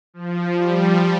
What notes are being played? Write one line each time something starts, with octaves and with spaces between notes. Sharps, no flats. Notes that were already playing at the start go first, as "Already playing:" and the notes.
F3
G3